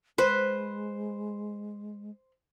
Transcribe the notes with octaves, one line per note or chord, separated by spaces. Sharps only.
G#3 B4 C5